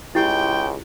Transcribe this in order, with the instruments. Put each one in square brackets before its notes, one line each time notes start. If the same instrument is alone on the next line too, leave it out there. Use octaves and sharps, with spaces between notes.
[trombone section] C#2 G#2 [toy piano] E4 G4 [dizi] G5